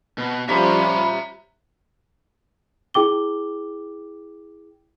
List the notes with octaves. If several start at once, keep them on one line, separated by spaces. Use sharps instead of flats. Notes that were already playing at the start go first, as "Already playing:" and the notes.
B2
F3 G3 C#4 E5 A#5 B5
E4 G#4 G5 D6 G7